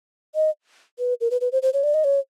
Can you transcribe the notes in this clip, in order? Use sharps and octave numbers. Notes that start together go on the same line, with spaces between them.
D#5
B4
A#4
B4
B4
C5
C5
C#5
D5
D#5
C#5